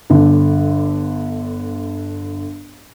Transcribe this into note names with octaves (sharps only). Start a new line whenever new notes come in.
G1 D3